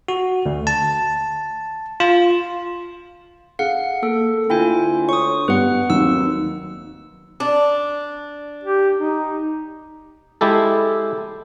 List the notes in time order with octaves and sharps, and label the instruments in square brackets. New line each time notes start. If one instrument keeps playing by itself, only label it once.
[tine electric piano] F#4
D2
A5
F4
[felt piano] G#4 [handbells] F5 F#5
[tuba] A#3 [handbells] A4
[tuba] D2 [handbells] E4 F4 G#5 [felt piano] G5
[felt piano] C#5 [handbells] C#6 D#6
[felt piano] G2 G3 B3 [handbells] B4 F#5
[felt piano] D#2 C4 [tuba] F#3 [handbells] E6
[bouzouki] D4
[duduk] G4
D#4
[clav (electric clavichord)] G#3 E4 G4 A4